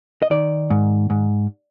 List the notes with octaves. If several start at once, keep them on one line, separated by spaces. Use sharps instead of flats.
D#5
D#3 D5
G#2
G#2